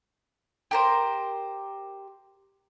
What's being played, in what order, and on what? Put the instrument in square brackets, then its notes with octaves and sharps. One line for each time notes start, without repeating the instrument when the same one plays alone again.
[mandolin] G4 A#4 C5